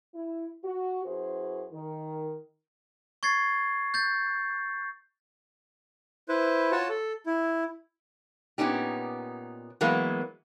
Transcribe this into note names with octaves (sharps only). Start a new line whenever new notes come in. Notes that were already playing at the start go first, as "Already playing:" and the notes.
E4
F#4
F#2 E4 F#4 G#4 B4 C5
D#3
C#6 G#6 A6 C7
G6 A6
E4 B4 C5
F4 F#4 C#5 A5
A4
E4
A#2 B3 C#4 D#4 G4
E3 F#3 G#3 A#3 B3